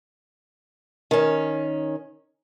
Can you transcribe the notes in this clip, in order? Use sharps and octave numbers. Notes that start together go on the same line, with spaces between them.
D#3 C#4